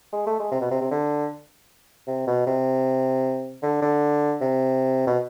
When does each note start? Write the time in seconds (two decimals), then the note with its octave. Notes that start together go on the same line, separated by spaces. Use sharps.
0.13 G#3
0.27 A3
0.39 G#3
0.52 C3
0.61 B2
0.71 C3
0.81 C3
0.91 D3
2.07 C3
2.27 B2
2.46 C3
3.63 D3
3.82 D3
4.41 C3
5.07 B2